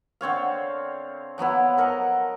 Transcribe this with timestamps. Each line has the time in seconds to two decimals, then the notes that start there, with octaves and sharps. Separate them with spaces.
0.21 D3 C4 C#5 F5
1.38 F3 F#3 B3 E4
1.78 A4 A#4 D#5 F#5